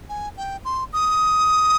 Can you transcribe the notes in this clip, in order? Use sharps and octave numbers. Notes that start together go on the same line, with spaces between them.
G#5
G5
C6
D#6